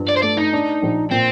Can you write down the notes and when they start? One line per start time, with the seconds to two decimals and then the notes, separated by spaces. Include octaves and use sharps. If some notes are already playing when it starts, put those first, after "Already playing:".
Already playing: G2 F3
0.09 D5
0.17 C5
0.23 A3 D5
0.37 D#4
0.53 D4
0.82 A#1
1.11 A#2 C4